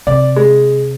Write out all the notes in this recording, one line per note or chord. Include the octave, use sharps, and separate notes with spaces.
C3 D5
G#3